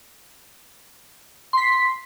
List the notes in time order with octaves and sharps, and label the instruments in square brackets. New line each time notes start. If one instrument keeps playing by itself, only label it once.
[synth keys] C6
B6
C7